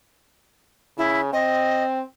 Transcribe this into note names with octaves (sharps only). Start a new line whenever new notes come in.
C#3 E4
C4 D#5